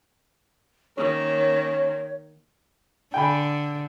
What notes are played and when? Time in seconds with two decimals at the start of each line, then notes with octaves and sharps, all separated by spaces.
0.98 D#3 A#3 C#4 C#5
3.14 D3 G5 G#5 B5